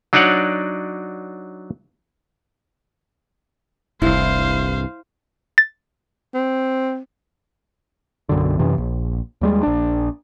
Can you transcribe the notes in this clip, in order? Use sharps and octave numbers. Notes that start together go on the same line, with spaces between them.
F#3 D4 D#4 C#5 D5 F#5
F1 C2 G2 E4 C5 F5
A6
C4
B1 F#2 D3
F#2 C3 E3
A#1
D#2 G3 G#3
A#1 D4